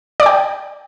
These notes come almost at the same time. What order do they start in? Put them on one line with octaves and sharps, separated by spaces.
D5 D6 G5